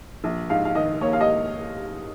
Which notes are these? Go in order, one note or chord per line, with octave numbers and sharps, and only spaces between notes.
A#1
G#2 F5
F5
D#3 D#5
A#3 C#5
F5
D#5